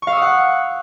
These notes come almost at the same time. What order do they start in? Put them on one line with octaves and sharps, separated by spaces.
C#6 F5 E6 D#6 F#5